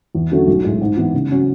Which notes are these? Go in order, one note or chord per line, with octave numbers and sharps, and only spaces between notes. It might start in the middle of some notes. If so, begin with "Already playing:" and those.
E2
D3 F#3 A3 C#4
B1
A2 G#3
G#2
E3 B3
C#3
F#3 C#4